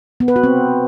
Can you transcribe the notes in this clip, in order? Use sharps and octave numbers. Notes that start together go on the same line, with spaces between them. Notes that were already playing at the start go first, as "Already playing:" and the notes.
B3
B4
F#4
C4